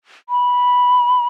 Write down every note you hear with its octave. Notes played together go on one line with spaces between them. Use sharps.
B5